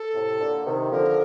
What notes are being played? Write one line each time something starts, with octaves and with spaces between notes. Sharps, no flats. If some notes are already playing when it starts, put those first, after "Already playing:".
Already playing: A4
A2 C3
A#2 D3
C3 D#3
D3 F3 A#4